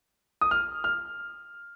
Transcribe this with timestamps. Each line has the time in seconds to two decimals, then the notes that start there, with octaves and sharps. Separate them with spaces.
0.41 D#6
0.51 F6
0.84 F6